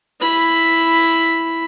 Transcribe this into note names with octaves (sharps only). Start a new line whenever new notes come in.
E4 B5